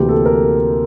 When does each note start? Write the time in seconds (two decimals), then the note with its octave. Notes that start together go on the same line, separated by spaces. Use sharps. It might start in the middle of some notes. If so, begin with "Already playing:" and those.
Already playing: D2 C3 E3 A#3 G4
0.09 A4
0.25 A#4